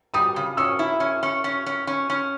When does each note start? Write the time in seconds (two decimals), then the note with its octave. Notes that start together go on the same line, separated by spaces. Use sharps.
0.14 G3 D#6
0.36 C#3
0.57 C#4 E6
0.79 E4
1.00 C#4
1.23 C#4
1.44 C#4
1.66 C#4
1.87 C#4
2.10 C#4